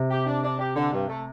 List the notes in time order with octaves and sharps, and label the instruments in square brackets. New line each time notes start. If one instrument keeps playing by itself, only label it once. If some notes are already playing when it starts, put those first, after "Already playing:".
Already playing: [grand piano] C3
[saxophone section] G4
D4
D4
G4
D3
G2
A3